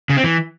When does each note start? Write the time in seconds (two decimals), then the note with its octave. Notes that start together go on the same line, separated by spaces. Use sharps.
0.09 C#3
0.17 C4
0.24 E3